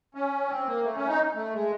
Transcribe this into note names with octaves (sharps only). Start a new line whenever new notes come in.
C#4
C4
A#3
A3
C#4
D#4
A3
G#3